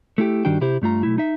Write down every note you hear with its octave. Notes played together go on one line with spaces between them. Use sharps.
A3 E4 G4
G2 D#3 G3 D4 F#4 G5
C3 E4 G4 C5
G2 A3 F4 A#5
B1 A3 E4
D#4 E5